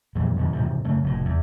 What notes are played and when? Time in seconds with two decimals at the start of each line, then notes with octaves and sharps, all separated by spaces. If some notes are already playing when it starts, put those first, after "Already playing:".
0.15 F2 A#2 E3 G3
0.36 F#2 B2 D#3 F3
0.53 G#2 C3 E3 F3
0.84 F#2 C#3 A3
1.04 F1 A2
1.25 E2